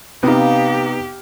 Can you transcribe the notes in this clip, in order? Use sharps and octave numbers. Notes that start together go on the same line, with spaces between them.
C3 B3 D#4 G4 F5 D#6